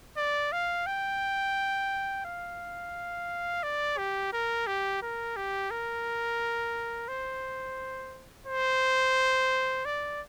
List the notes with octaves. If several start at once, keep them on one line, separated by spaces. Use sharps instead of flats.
D5
F5
G5
F5
D5
G4
A#4
G4
A#4
G4
A#4
C5
C5
D5